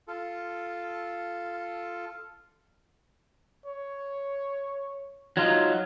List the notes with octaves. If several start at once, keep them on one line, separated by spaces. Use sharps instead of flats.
F4 A4
C#5
F#3 D#4 F4